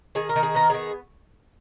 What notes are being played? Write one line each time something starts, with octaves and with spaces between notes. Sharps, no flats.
D#3 G#4
A#4
D#3
G#4
B3 A#4
D#3 G#4